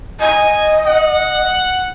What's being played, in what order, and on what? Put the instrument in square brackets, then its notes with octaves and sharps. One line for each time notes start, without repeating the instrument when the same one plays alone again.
[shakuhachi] D#5 [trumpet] G#5
[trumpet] F#5